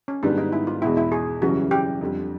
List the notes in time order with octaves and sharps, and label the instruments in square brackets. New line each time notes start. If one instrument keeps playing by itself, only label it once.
[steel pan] C#4
[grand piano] G#2 D#3 G3 B3 [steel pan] D4
[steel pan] D#4
E4
F4
[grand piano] E2 B2 G#3 [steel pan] E4
[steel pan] E4
G#4
[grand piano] F#2 C#3 E3 G3 [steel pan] F#4
[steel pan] G4
[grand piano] F2 D3 G3